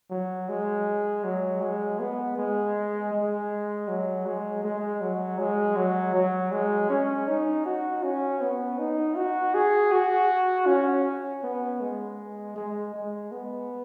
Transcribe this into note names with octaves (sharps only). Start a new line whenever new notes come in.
F#3
G#3
F#3
G#3
B3
G#3
G#3
F#3
G#3
G#3
F#3
G#3
F#3
F#3
G#3
C#4
D#4
F#4
C#4
B3
D#4
F#4
G#4
F#4
C#4
B3
G#3
G#3
G#3
B3